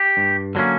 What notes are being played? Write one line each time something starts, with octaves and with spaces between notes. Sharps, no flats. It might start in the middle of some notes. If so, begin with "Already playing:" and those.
Already playing: G4
G2
D3 F#3 A#3 C#4